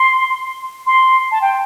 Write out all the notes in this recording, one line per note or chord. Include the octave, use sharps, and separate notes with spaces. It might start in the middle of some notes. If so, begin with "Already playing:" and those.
Already playing: C6
C6
A5
G5